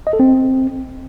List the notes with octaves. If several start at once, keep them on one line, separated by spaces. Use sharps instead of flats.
D#5
A4
C4